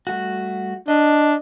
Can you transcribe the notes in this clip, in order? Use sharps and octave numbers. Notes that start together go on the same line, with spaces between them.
G3 A3 F#4
D4 D#5